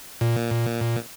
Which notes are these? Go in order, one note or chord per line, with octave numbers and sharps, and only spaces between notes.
A#2